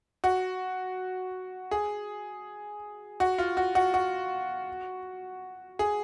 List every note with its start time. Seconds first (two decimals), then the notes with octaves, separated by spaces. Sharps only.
0.24 F#4
1.71 G#4
3.20 F#4
3.38 F4
3.57 F#4
3.75 F#4
3.94 F#4
5.79 G#4